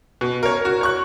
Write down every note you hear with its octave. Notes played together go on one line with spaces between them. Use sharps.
B2
A#4 C#5
F#4
C#5 C#6 F#6